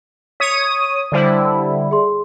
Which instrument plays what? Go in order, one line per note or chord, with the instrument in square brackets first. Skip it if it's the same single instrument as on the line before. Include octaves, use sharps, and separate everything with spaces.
[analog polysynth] C#5 D#6 [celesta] B6
[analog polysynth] D3 G3 E4 [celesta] C5 D5
[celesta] G#4 C6